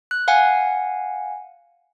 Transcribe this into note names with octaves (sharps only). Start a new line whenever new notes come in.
F#6
F5 F#5 G#5